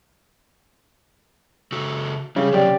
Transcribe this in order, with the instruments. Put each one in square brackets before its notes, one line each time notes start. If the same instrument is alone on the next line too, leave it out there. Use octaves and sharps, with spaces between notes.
[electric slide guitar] C#3 F#4 A4
[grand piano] C#3 [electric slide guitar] G3
[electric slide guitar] C3 F#3 [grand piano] C#4 G4 D5